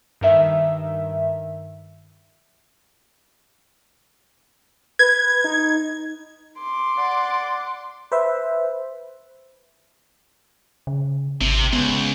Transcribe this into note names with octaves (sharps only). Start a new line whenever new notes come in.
G2 D#3 E5
B4 G#6
D#4
C6 D6
D5 F#5
B4 C5 E5
C#3
G#1 C3
C#2 B3